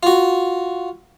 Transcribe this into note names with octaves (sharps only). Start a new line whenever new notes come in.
F4 F#4